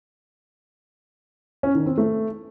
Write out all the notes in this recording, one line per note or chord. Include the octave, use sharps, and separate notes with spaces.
C#4
D#3
C4
A3